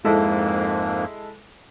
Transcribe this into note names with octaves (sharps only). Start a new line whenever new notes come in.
F2 G#2 G#3 A#3 E4 A4